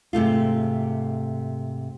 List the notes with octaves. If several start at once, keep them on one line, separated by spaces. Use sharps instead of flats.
G#2 C3 A3 F4